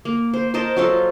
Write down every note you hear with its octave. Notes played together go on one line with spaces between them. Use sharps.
A#3
C5
A#4 C5 D#5 A5
F#3 F4 A4